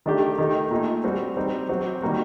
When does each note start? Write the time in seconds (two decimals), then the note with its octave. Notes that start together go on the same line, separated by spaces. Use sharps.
0.06 D#3 A3 D4 G4
0.38 D#3 A3 D#4 G4
0.71 A#2 A3 D#4 A4
1.04 G3 C4 F#4
1.37 G3 C4 D#4
1.69 F#3 C4 F#4
2.02 D#3 G3 A#3 F#4